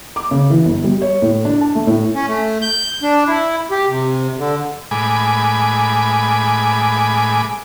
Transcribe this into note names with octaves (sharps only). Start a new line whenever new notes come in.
D6
C#3
E3
G1
G3
C#5
A2
D4
A5
A3
A2
C#4
A3
G6
D4
E4
G4
C3
D3
A2 G#3 G#5 B5 D6